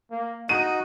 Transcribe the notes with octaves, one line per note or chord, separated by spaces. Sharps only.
A#3
D#4 F#4 D#5 D#7